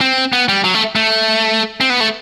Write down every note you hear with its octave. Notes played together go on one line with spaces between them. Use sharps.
C4
B3
G3
F#3
A3
A3
C4
B3
A3